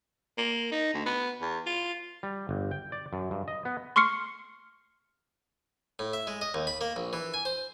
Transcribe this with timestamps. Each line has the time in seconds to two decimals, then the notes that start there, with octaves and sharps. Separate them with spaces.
0.38 A#3
0.72 D#4
0.94 D2
1.06 B3
1.41 E2
1.66 F4
2.23 G3
2.49 G1
2.71 G5
2.92 D5
3.13 F#2
3.31 G2
3.48 D#5
3.65 B3
3.96 C6 C#6 F6 C7 C#7
5.99 A2
6.13 E5
6.27 G#3
6.41 D#5
6.54 D#2
6.67 B5
6.81 A#3
6.96 A#1
7.13 E3
7.34 G#5
7.45 C5